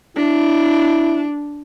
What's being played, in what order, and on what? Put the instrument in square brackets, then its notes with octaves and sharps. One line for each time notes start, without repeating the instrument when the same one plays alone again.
[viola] D4 [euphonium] E4